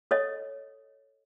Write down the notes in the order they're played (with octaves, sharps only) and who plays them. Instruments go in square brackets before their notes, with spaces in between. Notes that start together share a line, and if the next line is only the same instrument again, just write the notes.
[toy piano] A4 C#5 D#5